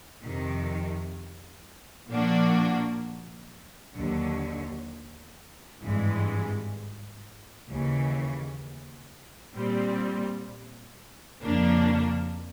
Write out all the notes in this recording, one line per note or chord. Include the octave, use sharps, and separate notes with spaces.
F2 C3 D#3
A#2 F3 A#3 D4 F#4
D#2 D3 F#3
G#1 G2 E3 G#3
D#2 C#3 E3
A#2 G3 C4
F2 C#3 F3 A#3 D4